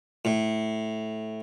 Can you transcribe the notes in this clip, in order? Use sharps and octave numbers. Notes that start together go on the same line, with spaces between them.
A2